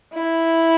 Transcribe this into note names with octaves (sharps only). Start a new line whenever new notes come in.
E4